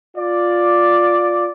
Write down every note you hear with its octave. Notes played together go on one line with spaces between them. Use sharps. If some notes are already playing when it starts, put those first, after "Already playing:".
F4 D5